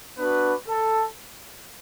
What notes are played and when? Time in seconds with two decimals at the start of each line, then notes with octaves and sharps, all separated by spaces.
0.18 B3 D4 F#4 B4
0.69 A4